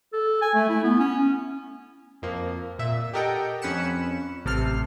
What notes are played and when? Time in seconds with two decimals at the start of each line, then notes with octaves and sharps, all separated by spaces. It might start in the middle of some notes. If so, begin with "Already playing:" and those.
0.13 A4
0.42 G#5
0.54 A3
0.69 E4
0.84 B3
0.99 C#4
2.22 F2 F3 A#3
2.79 A#2 E5
3.14 G4 A4 A#4 D#5 F#5 G5
3.62 F2 C#4 B5 F#6 C#7 E7
4.45 A1 C3 A4 F6 C7